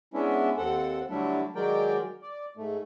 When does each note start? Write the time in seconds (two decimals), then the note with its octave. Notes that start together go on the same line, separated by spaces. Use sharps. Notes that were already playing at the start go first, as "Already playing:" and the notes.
0.14 G#3 B3 C#4 D4 E4
0.58 D#2 C4 A4 F#5
1.09 D3 F#3 G3 A3 D4 E4
1.55 D#3 F#3 G#3 A#4 D5 G5
2.22 D5
2.57 G#2 A3